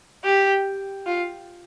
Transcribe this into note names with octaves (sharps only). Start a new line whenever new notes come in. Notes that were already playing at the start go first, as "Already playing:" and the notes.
G4
F4